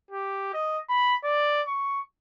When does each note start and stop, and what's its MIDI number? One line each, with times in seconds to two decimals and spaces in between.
0.11 0.51 67
0.54 0.79 75
0.89 1.15 83
1.24 1.62 74
1.67 2.01 85